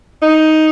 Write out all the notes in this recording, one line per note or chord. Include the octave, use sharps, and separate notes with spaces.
D#4